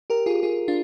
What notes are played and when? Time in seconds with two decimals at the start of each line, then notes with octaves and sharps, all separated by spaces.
0.10 G4 A#4
0.26 F4 G#4
0.43 F4 G#4
0.68 D4 F4